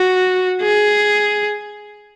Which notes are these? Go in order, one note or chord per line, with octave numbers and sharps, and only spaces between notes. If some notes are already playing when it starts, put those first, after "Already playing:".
Already playing: F#4
G#4